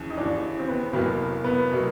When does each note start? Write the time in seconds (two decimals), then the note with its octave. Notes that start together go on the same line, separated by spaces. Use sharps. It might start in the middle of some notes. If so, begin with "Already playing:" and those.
Already playing: D#2 C#3 E3
0.10 D#4
0.18 D#2 C#3 E3 D4
0.59 C4
0.68 B3
0.93 F1 E2 B2 F#3 A#3 B3
1.44 B3
1.72 B2 F#3 A#3